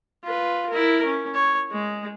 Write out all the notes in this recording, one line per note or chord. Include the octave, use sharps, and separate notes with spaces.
F4 B4
E4 A#4
C#4
C#5
G#3